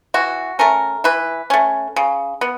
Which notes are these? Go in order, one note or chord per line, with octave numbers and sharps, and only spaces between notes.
E3 F#4
A3 C#4 A#4
E3 B4
A3 C#4
C#3
B3